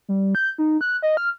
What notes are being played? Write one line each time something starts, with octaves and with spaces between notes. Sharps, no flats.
G3
G6
D#4
F#6
D#5
F6